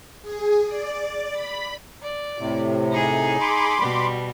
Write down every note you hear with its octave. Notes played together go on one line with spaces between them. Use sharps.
G#4
D5
B5
D5
A2 C3
D#4 G#4
B5 C6 D6
B2 G3